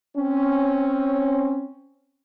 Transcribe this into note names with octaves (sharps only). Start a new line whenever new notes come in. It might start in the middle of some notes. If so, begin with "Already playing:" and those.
C4 C#4